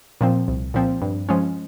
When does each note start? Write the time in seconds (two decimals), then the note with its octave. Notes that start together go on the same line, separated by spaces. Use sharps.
0.21 A#2 F3 C4
0.48 C2
0.74 A#2 F3 C4
1.02 G2
1.29 F3 G#3 C#4